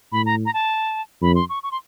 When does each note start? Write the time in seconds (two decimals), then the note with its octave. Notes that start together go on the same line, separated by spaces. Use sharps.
0.12 A2 B5
0.26 A#5
0.45 A#5
0.54 A5
1.22 F2 B5
1.35 C6
1.49 C#6
1.63 C#6
1.72 C6